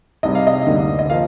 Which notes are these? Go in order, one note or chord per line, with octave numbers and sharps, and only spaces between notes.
C2 C3 G3 D#5
F5
D#5
D2 D3 G3 A#3
D#5
F3 A#3 F5